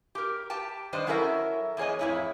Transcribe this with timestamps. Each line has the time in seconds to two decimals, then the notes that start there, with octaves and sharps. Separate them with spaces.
0.15 G4 A#4
0.50 G4 G5 A5
0.93 D#3 G3 D4 C5 D#5
1.07 F#3 C#4 E4 A4 A#4 E5
1.77 E2 A#3 G#4 C#5 D#5
1.99 F2 A2 E4 G#4 C#5